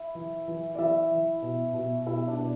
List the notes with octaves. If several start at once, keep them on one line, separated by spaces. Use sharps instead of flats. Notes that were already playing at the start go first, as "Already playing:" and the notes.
Already playing: E4
E3
E3
D5
E3 E4 E5
E3
B2
B2
B2 E4 E5
D4 D5
B2